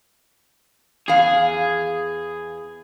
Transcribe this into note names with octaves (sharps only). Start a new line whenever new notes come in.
E2 G#4 F5